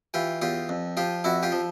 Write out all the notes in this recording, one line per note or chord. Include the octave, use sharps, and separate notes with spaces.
E3 F4 G4
E2 F4 G4
F2
F3 F4 G4
F2 E4 F#4
F4 G4
F3